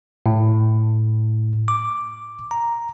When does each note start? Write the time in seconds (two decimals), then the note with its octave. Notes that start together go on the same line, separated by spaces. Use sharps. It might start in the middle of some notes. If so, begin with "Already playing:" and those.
0.26 A2
1.68 D6
2.51 A#5